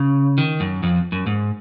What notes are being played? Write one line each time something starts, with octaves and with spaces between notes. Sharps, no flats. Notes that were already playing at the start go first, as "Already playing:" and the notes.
Already playing: C#3
D#3
F#2
F2
F#2
G#2